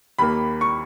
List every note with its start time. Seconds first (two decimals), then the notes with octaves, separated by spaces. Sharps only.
0.19 D#2 D#3 A#3 B5
0.61 C#6